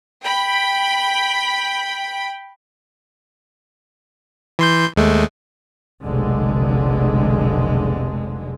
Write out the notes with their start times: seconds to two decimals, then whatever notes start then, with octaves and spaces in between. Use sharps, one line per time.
0.23 G5 B5
4.59 E3 C6 G6
4.96 D#2 G#3 A3
6.04 F1 B1 D3 G#3